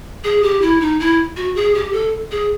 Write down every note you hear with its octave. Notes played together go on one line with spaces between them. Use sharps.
G#4
G4
E4
D#4
E4
F#4
G#4
G4
A4
G#4